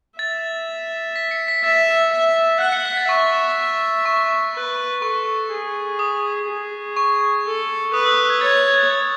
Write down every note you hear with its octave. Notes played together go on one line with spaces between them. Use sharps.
E5 A6
B6
C#7
B6
E5 A6
E5
F#5 F#6
C#7
B6
A6
E5 C#6
C#6
B4
A4 C#6
G#4
D#6
G#4
C#6
A4
B4 D#6
E6
F#6
G#6
C#5 A6
G#6
A6
A6